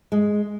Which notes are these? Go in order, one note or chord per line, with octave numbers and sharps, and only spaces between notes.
G#3